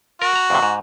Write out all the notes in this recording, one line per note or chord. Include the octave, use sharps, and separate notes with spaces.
F#4 A#4
A#5
F2 A2 C3
G#2